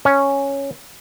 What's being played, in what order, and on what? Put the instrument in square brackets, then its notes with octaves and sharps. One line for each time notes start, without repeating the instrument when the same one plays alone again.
[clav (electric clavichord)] C#4